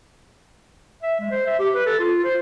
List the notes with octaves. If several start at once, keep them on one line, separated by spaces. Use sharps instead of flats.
E5
G#3
C5
E5
G4
B4
A4
F4
C5